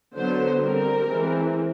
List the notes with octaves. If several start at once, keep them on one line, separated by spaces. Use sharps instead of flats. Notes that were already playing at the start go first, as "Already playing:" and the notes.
D3 F#3 B3 C5
G3 C4 A#4
E3 G#3 C4